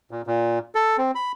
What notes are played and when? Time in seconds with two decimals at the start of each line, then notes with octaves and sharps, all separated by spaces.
0.11 A#2
0.27 A#2
0.75 A4
0.98 C4
1.15 B5